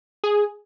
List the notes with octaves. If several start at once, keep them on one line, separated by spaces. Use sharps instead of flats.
G#4